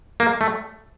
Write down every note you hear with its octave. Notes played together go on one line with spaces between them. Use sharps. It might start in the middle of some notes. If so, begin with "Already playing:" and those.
A#3
A3